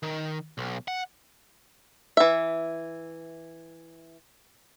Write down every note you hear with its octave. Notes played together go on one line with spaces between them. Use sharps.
D#3
B1
F#5
E3 E5